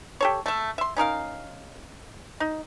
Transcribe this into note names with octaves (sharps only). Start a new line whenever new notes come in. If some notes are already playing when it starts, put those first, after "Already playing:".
G4 A4 C#5
A3 E5
E5 C6
C#4 D#4 A#4 F5
D#4